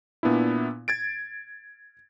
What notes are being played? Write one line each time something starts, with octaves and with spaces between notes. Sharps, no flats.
A#2 B3 D4 E4
G#6 A6 D7